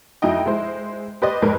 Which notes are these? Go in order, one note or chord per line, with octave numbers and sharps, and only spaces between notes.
F2 D#4 E4 F#4 D#5 G5
G#3 E4 C5
G4 B4 C5 D5 D#5
F2 G#2 A#4 B4